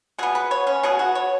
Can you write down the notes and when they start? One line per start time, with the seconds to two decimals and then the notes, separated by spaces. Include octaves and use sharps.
0.18 B2 B3 G#4
0.35 B4
0.51 C#5
0.67 C#4
0.83 B2 B3 G#4
0.99 F#4
1.15 C#5